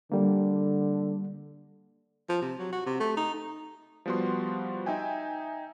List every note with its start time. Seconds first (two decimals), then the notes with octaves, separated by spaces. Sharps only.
0.12 D3 G3 A#3
2.29 F3
2.42 C3
2.59 F#3
2.73 F#4
2.86 C3
3.00 A3
3.17 D#4
4.06 F3 G3 B3 F#4 C6
4.86 D#4 E5 G5 G#5